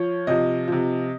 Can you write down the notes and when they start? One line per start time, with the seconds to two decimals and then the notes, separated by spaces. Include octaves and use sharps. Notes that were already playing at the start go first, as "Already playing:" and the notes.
Already playing: F3 C#5
0.27 C3 F3 D#5
0.68 C3 F3